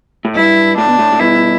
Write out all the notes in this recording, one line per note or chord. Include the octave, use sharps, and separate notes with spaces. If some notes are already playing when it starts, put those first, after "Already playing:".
A2
G2 E4
A2 D4
B2
A2
A2
G2 B2 E4